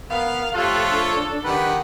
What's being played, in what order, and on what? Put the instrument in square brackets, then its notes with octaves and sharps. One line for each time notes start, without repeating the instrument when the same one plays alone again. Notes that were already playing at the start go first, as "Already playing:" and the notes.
[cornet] B3 [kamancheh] A#4 [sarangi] F5
[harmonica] F3 A3 C#5 [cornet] F4 [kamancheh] G4 F#6 [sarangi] A4
[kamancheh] D4
[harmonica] D#3 G4 F#5 [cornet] B4